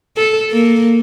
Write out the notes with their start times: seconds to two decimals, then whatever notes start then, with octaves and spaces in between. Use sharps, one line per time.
0.17 A4
0.52 A#3